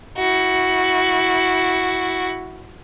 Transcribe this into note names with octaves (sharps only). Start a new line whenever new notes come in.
E4 F#4